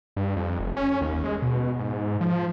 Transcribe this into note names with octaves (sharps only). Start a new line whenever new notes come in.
G2
F2
F1
C#4
D#2
G#3
B2
G#2
F3